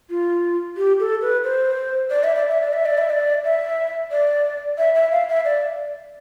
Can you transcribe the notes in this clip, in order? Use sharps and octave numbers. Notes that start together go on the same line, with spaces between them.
F4
G4
A4
B4
C5
D5
E5
D5
E5
D5
E5
D5
E5
D5
E5
D5
E5
E5
F5
E5
D5